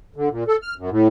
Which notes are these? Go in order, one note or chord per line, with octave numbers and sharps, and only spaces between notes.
D3
A#2
A4
F6
F#2
A2